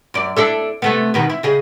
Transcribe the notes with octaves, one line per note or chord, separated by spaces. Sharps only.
F#2 D5
D4 E4 A4
C3 A3 B3
B2 D#3 B3
E4
C#3 G#4 D#5